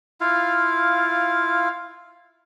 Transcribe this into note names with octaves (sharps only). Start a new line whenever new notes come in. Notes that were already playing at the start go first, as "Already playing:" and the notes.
E4 F4 F5